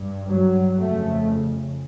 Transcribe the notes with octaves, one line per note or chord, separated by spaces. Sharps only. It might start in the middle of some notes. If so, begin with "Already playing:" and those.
Already playing: G2
F#3
F2 C#3 A3